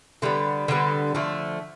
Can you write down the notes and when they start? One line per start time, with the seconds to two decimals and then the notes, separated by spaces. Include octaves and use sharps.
0.22 D3 G3 B3
0.68 D3 G3 B3
1.15 D3 F3 A3